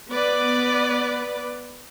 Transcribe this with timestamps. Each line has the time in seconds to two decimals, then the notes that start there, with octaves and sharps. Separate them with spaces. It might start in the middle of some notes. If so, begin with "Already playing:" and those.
0.11 B3 B4 D5